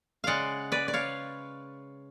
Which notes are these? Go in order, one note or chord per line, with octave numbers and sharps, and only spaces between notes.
C#3 G#3 D5 F5 F#5
B4 D5
D5
C#5 F5